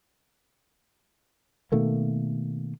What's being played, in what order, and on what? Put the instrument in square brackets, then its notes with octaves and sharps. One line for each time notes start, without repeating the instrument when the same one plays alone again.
[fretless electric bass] B2 D#3 A3 A#3